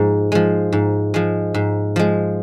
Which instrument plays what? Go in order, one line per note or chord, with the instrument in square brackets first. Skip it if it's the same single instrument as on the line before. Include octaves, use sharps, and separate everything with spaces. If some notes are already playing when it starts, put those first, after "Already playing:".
Already playing: [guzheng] G#2 F3 G#3
F3 G#3
G#2
F3 G#3
G#2
F3 G#3